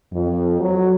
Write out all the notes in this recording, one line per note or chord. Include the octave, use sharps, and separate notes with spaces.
F2
F#3